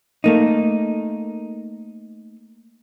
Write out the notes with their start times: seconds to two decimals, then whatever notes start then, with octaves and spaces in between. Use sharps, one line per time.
0.24 A3 A#3 D#4